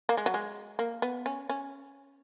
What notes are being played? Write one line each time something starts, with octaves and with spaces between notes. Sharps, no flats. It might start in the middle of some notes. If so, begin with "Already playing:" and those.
A#3
G#3
F#3
G#3
A#3
B3
C#4
C#4